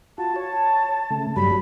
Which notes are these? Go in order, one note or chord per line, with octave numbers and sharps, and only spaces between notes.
F4 F#4 A5
C#5
C#3 A3
G2 F#3 G3 B5